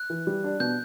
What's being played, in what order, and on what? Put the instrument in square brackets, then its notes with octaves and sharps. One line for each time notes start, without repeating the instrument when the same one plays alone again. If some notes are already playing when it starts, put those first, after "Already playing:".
Already playing: [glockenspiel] F#6
[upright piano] E3
G3
D4
[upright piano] B2 [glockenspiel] G6